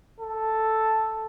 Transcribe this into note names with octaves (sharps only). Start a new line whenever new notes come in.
A4